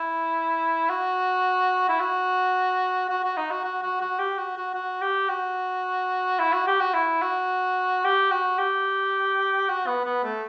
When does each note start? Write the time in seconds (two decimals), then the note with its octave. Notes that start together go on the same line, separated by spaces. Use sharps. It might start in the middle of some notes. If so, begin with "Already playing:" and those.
Already playing: E4
0.89 F#4
1.89 E4
2.00 F#4
3.09 F#4
3.24 F#4
3.37 D#4
3.50 F#4
3.64 F#4
3.82 F#4
4.01 F#4
4.19 G4
4.38 F#4
4.56 F#4
4.74 F#4
5.01 G4
5.29 F#4
6.39 E4
6.53 F#4
6.67 G4
6.80 F#4
6.94 E4
7.22 F#4
8.04 G4
8.31 F#4
8.58 G4
9.69 F#4
9.87 B3
10.05 B3
10.24 A3